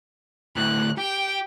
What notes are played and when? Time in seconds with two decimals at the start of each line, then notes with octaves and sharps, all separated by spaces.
0.56 D2 A2 F#6
0.98 G4 G5